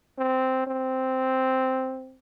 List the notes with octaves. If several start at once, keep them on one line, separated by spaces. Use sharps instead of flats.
C4
C4